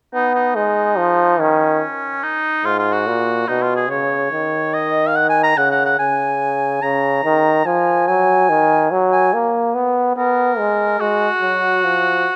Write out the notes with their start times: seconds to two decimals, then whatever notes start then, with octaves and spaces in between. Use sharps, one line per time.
0.14 B3 D#4
0.35 D#4
0.56 G#3 D#4
0.98 F3
1.40 D#3 C#4
2.23 D#4
2.64 G#2 F4
2.79 F4
2.93 F#4
3.07 A#2
3.48 B2 D#4
3.62 F4
3.76 G#4
3.90 C#3 C#5
4.32 D#3
4.74 D#5
5.07 F5
5.15 F#5
5.29 G#5
5.43 A#5
5.57 C#3 F#5
5.71 F#5
5.85 F#5
5.99 C#3 G#5
6.82 C#3 A#5
7.24 D#3
7.66 F3 G#5
8.08 F#3 G#5
8.50 D#3
8.91 F#3
9.12 G#5
9.33 A#3
9.75 B3
10.17 B3 A#4
10.58 G#3
11.00 G#3 F#4
11.42 F#3
11.84 F3